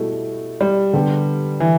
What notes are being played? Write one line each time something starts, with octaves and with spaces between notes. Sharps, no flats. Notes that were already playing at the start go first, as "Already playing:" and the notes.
Already playing: B2 G3 A3 E4
G3
D3 B3 G4
E3